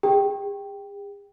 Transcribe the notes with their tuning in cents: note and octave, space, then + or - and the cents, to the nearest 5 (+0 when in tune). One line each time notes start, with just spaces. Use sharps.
G#4 -45 G5 +0